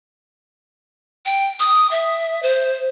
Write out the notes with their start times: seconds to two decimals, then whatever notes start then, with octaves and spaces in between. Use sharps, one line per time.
1.26 G5
1.60 D#6
1.91 E5
2.43 C5